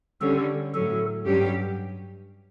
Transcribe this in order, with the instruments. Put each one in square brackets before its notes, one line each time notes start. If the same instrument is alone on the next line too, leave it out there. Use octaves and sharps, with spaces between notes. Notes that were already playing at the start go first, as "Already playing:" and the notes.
[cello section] D3 G3 C#4 [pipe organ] A4
[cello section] A2 F#3 C#4 [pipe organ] A4
[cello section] G2 F#3 C#4 G4